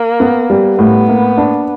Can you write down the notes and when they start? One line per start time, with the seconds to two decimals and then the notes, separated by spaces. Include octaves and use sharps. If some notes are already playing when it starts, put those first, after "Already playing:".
Already playing: A#3
0.20 B3
0.50 G3
0.79 A2 B3
1.09 A#3
1.37 D4